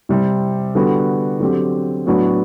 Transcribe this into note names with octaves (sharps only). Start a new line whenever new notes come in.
C3 G3 C4
D3 G3 B3 F#4
D3 F#3 C4 G4
A2 F#3 B3 D4 F#4